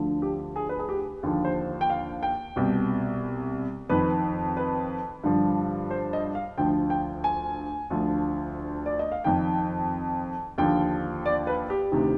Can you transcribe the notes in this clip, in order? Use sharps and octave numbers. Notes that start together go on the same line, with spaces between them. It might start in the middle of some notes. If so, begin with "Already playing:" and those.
Already playing: D2 D3 F3
G4
G#4
B4
G#4
G4
D#2 D3 F3
C5
G5
F5
G5
C2 B2
F2 D#3 B4
B4
G2 D3 F3
C5
D#5
F5
D2 D3 F3 G5
G5
G#5
D2 D3 F3
D5
D#5
F5
F2 D#3 G5
D#2 D3 F3 G5
D5
B4
G4
D2 C3 D#3